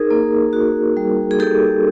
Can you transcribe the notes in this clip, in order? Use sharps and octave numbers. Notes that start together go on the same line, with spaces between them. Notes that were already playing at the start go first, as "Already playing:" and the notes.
Already playing: D#4 G#4 A#4
A#3
F#4
G3
G#4
D#4 G4 A4